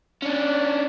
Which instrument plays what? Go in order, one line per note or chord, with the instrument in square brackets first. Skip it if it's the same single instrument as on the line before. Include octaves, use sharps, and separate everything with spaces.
[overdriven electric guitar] C#4 D4